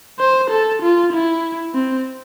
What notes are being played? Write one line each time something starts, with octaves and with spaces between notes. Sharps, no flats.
C5
A4
F4
E4
C4